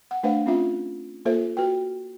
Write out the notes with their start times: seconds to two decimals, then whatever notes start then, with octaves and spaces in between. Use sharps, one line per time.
0.11 F#5
0.23 A3 D4 B4 C5 F5 F#5
0.46 C4 C#4 F4 E5
1.25 A#3 F4 A4 C5 E5
1.57 F#4 B4 G5